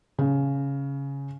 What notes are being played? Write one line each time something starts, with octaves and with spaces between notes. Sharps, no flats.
C#3